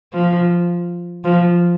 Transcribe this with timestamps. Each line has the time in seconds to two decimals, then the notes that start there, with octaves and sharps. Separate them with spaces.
0.13 F3
1.24 F3